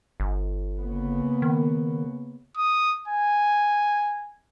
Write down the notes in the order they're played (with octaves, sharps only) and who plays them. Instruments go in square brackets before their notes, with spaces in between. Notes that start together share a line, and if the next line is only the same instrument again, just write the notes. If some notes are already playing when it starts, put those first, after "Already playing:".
[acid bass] G1
[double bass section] C#3 A#3 B3
[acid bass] D#3
[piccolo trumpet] D#6
G#5